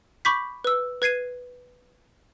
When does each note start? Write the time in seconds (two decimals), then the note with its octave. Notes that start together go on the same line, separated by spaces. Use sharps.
0.25 B5 C#6 D6 G6 B6
0.64 B4 E6
1.02 B4 G#6 C7 D#7